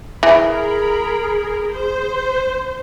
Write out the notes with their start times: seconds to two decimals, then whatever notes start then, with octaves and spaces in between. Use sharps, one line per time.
0.23 E3 G#4 A#4 B5
1.73 C5